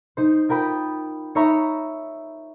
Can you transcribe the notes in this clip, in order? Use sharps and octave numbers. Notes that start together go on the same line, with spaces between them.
D#4 C5
F4 A#4 G5 B5 D#6
D#4 C#5 E5 A#5 B5